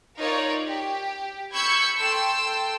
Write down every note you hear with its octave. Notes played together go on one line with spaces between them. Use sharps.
D#4 F4 A#4 C#5 D5
G4
B5 C#6 E6 G6 G#6 C#7
A4 G5 C6 E6